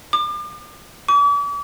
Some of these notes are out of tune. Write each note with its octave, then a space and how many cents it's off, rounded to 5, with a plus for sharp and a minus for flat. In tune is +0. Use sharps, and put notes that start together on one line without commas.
D6 +40
D6 -45